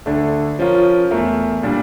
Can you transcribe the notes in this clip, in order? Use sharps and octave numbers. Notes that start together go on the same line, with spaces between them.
D2 D3 A3 D4
F3 C#4 F4 A#4
E2 E3 A3 E4 A#4
A#2 G3 D4